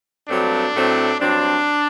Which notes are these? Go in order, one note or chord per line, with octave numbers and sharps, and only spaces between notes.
G2 F#3 A3 C4 D4
A2 F#3 A3 C4
G2 F#3 C4 D4